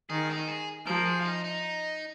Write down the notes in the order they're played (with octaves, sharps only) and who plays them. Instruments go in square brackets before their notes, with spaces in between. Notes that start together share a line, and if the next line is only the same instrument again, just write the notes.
[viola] D#3 [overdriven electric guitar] G#4
[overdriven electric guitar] D#4
G#4
[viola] F3 [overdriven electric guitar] A#4
[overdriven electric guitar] G#4
F4
D#4
D#4